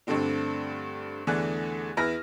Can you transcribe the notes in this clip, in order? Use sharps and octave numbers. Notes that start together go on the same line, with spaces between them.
G2 D3 A3 C4 D4
E2 D3 E3 A3 D4 F#6
E2 E4 B4 F6 A#6